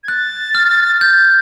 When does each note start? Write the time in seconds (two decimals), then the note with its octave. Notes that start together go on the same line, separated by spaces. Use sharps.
0.04 G#6
0.08 F#6 A6
0.55 F6
1.01 G6 A6